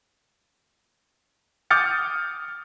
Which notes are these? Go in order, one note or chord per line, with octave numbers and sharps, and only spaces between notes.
D6 D#6 F6 G6 A6 C#7